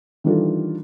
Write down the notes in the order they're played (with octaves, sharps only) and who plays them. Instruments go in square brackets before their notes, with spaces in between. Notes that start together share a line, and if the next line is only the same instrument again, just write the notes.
[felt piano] D#3 E3 G3 D4 F4 A4